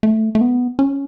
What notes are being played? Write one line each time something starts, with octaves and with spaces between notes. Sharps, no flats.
A3
A3
B3
C#4